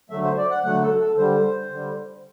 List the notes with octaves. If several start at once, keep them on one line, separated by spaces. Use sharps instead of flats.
D3 F#3 A3 E5
C5
D5
F#5
D3 F#3 A3 F#5
A4
A4
D3 G3 C5
D3 G3